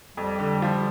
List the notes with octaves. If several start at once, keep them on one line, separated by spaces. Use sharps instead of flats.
F2 G3
D3
F3